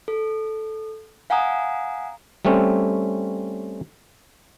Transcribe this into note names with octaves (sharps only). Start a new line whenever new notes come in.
A4
F5 F#5 G#5 A#5 D#6
G3 A3 C4 C#4